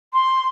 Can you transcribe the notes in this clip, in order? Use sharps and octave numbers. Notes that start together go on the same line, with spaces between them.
C6